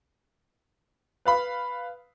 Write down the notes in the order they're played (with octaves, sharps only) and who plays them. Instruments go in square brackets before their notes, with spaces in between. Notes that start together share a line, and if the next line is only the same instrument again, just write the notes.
[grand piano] B4 F5 B5